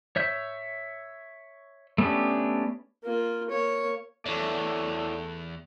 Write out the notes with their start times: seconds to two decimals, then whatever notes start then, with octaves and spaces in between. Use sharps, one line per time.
0.16 C#5 E5 G6
1.98 A3 B3 C#4 D4 G4
3.04 A#3 F4
3.50 A#3 C#5
4.26 E2 A3 E4 C#5 D5